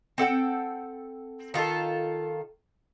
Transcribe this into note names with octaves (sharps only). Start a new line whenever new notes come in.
C4 A4 F#5 G5
D#3 F4 G4 A4